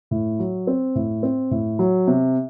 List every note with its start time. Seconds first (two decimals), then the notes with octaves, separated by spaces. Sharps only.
0.11 A2
0.39 F#3
0.67 C4
0.95 A2
1.23 C4
1.51 A2
1.79 F#3
2.08 C3